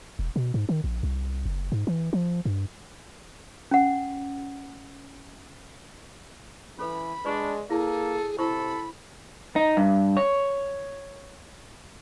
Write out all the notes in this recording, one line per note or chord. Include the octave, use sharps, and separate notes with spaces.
E1
B2
G#2
D#3
A#1
C2
F#1
G#2
E3
F3
G2
C#4 F#5
E3 C#4 A4 B4 B5
G#3 D4 B4 D5 C#6
A#3 E4 G#4 A4
C3 E4 A4 C5 B5 C#6
D#4
G2
C#5